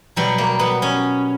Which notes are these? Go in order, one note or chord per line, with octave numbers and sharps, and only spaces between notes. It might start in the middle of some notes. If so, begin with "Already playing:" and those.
B2 F#3 G3
A#3
B3
C#4